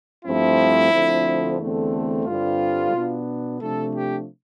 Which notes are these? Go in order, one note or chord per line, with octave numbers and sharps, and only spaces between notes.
G2 F3 A3 C4 E4
D2 D3 F3 C4
E2 D3 A3 C4
G2 D3 G3 C4 F4
B2 B3 D4
C3 F3 A3 D4 A4
G4